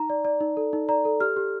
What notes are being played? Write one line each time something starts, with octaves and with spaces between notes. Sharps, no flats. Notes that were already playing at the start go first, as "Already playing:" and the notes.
Already playing: D#4 A#5
D5
D5
D#4
A4
D#4
D5 A#5
A4
G4 F6
G4